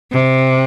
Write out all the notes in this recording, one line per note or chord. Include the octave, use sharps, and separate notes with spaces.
C3